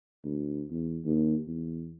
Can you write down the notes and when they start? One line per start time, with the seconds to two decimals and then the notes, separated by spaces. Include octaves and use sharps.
0.24 D2
0.70 E2
1.05 D#2
1.47 E2